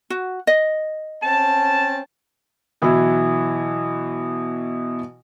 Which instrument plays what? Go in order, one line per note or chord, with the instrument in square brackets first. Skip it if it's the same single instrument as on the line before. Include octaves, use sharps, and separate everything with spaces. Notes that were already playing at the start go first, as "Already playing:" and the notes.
[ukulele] F#4
D#5
[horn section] C4 C#4 A5
[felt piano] B2 E3 F#3 E4